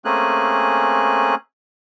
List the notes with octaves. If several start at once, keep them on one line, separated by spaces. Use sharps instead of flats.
A3 A#3 C4 C#4 G#4 F#6